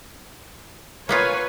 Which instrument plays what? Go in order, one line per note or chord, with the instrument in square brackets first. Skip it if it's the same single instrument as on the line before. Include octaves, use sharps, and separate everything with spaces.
[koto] A#3 B3 F4 [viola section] B4 C#5 G#5